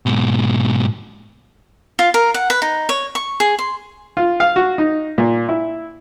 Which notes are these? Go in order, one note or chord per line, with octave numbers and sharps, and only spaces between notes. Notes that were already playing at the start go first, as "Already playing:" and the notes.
G#2 B2
F4
A#4
F#5
B4
D#4
C#5
C#6
G#4
C6
F4
F5
F#4
D#4
A#2
E4